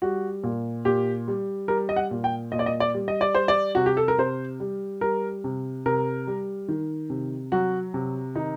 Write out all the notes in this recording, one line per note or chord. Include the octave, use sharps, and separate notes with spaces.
G3 F#4
A#2
A#2 G4
G3
G3 A#4
D#5
F#5
A#2
G5
A#2 D#5
D5
D#5
D5
G3
D#5
D5
G3 C5
D5
C3 F#4
G4
A4
A#4
C3 C5
G3
G3 A#4
C3
C3 A#4
G3
D#3
C3
F#3 F#4
C3
D#3 D#4